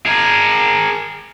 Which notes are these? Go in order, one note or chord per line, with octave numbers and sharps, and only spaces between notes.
G#4 A#4